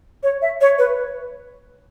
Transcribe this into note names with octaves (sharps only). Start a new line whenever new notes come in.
C#5
E5
C#5
B4